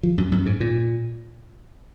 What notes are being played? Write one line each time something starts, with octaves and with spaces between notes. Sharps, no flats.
F3
F#2
F#2
G#2
A#2